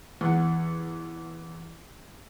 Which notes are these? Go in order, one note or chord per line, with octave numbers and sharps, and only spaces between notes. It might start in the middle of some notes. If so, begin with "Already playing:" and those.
E2 F#5